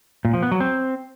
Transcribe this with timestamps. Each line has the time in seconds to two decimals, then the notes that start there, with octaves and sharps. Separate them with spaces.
0.25 A#2
0.34 F3
0.43 B3
0.51 F#3
0.60 C4